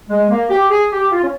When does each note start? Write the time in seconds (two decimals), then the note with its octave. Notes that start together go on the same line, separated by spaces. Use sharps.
0.09 G#3
0.29 A#3
0.50 G4
0.70 G#4
0.92 G4
1.12 F4
1.23 C#4